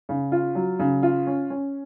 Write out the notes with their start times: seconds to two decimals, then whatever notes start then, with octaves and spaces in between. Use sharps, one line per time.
0.09 C#3
0.32 F4
0.55 F#3
0.79 C#3
1.03 F4
1.27 C#4
1.50 C#4